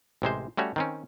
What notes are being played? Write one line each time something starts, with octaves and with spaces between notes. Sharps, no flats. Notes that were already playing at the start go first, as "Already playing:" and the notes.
A1 C3 G#3 C5
G3 A3 C#4 F#4 C#5
D#3 C4 C#4